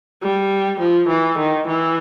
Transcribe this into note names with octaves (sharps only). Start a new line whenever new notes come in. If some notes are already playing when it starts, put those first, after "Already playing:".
G3
F3
E3
D#3
E3